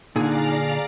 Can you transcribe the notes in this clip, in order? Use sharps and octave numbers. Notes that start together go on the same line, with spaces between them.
A#2 D3 D#4 G#4 D5 F5 A#5